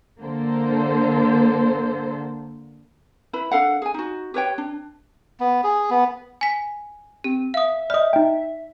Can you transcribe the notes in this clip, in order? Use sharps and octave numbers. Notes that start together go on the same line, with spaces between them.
D3 A#3 A4 C5
E4 B4 B5
D4 A4 F5 F#5
G#4 G#5
D#4 F#4
G4 B4 C#5 G5
D4
B3
G#4
B3
G#5 B6
C4 G4
E5 F5 D#6
D5 D#5 D#6 F6
D#4 G5